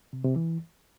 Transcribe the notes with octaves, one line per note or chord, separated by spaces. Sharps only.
C3
C3
E3